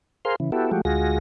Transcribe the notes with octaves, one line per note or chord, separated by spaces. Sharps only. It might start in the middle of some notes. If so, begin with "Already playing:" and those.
G#4 A#4 C5 F5 C6
C#3 E3
B3 E4 F#4 G4 A4
F3 G#3 A3 F#4 G4
D2 G#3 F4 F#4 G#4 A#6